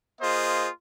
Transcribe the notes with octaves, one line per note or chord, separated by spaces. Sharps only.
A#3 F4 G#4 C5 D#5